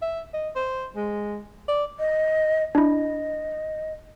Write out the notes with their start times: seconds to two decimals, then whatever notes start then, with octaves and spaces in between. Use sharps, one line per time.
0.02 E5
0.34 D#5
0.56 C5
0.96 G#3
1.68 D5
1.99 D#5
2.75 D4 E4 D#5